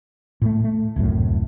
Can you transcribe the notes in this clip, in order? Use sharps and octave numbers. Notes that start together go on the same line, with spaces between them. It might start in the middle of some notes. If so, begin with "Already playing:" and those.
A2 A3
A3
D1 C2 F#2 A2